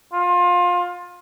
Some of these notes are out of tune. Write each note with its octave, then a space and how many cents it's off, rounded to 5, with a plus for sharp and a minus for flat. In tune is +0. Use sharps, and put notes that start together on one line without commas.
F4 +25